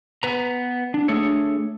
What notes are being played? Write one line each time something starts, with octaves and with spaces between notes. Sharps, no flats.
B3 B4 A#5
D4
A3 D4 G#4 A4 C#5